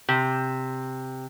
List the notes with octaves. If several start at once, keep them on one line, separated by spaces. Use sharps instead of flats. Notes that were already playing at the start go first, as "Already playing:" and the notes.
C3